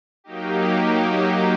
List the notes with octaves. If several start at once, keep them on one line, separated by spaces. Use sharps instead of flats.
F#3 A#3 D#4 G4